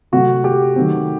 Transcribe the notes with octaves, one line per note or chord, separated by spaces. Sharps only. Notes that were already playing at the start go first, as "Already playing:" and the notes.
C3 F#3 A3 C4 F#4
G4
D#3 F#3 A3 C4